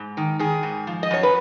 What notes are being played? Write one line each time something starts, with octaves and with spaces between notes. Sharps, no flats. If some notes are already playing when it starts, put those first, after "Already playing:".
Already playing: G#2
D#3
D#3 G#4
G#2
F3
D#5
F#2 C#5
B4